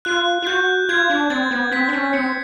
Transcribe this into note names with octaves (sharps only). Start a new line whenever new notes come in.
F4 F#6
F4
F#4 G6
F4 G#6
D4
C4 A6
B3
C4 B6
D4
C#4
C4 C#7